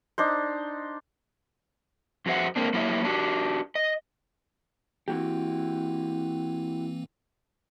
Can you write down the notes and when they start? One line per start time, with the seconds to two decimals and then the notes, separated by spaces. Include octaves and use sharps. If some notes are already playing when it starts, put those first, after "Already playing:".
0.18 D4 D#4 C5
2.26 F2 F#4 G#4 C5 E5 F#5
2.56 G#3 A#3 C4 D4
2.73 F#3 A#3 E4 G4 C#5 E5
3.04 D4 F#4 G4
3.75 D#5
5.08 E3 A#3 C4 E4 F#4 G4